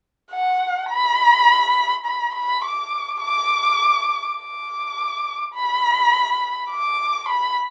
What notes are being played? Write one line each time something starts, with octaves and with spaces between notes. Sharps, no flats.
F#5
B5
B5
B5
D6
D6
D6
B5
D6
B5